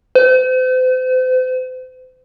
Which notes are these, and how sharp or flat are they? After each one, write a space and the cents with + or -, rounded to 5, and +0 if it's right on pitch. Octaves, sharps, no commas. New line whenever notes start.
C5 -40